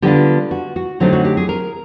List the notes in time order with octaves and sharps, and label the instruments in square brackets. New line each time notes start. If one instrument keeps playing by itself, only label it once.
[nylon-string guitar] D3 G3 B3 D4 F4 G4
F#4
F#4
D3 F#3 A3 C4 D#4 G4
F#4
G4
G#4
A#4